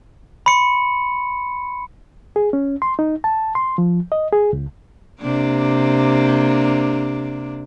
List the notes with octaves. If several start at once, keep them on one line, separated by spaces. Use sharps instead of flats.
B5 C6 C#7
G#4
C#4
C6
D#4
A5
C6
F3
D#5
G#4
C#2
C3 A#3 D4